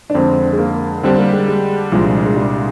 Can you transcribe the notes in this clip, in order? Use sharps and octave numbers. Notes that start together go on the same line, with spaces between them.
D4
F2 D3 G#3 C4
G#3
A#3
D3 G3 C4 D4 G4
A#3
G#3
G#3
C2 A#2 F3 G#3 D4 F4
G#3
G3